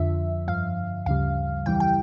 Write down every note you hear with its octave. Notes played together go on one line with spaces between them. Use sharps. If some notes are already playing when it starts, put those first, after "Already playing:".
Already playing: F2 D3 F3 E5
G2 F3 F5
D2 C#3 G3 F5
F2 E3 G3 G5
G5